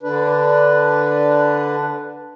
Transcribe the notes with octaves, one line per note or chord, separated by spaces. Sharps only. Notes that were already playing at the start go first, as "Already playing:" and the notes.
D3 D4 B4